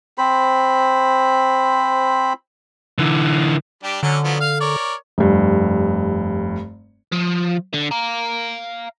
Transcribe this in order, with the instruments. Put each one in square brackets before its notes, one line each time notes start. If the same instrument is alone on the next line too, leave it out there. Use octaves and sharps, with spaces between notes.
[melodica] C4 C5 B5
[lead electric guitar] D3 E3
[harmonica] G3 D4 G4
[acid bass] D3 [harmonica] F#3 C#4
[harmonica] F3 F#3 B3
F5 F6
A#4 C#5 D5
[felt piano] F1 G2
[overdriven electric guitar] F3
D3
F5 A#5